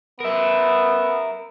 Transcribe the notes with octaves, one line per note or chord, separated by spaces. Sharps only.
B3 A#4 E5